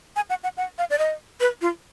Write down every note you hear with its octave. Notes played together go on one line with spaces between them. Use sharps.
G#5
F#5
F#5
F#5
F5
D5
D#5
B4
F4